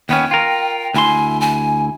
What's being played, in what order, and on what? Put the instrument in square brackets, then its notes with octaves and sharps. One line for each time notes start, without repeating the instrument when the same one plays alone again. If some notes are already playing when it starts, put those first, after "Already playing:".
[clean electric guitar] D#2 B3 C#4 [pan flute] G5
[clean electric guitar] F4 A#4
[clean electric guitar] D2 E4 C6 [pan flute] G#5
[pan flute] G#5